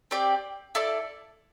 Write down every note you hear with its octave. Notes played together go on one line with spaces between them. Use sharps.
C4 G4 D5
E4 A4 D5